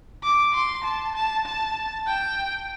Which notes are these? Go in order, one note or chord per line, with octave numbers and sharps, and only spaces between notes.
D6
C6
A5
A5
A5
G5